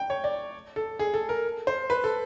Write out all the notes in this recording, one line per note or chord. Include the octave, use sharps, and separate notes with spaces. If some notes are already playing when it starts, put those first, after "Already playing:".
Already playing: G5
C#5
D5
A4
G#4
A4
A#4
C5
B4
A4